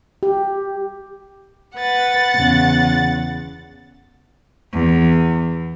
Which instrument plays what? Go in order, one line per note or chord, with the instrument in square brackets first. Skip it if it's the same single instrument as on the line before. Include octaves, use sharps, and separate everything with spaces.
[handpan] G4
[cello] B4 [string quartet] F#5 A6
[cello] E2 C#3
E2